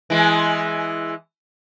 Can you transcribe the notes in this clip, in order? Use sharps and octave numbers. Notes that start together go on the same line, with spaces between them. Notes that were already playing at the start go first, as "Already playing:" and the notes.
E3 G#3